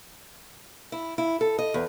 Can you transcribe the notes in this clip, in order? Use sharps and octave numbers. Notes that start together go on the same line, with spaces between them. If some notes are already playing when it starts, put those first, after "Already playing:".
E4
E4
A4
D#5
E2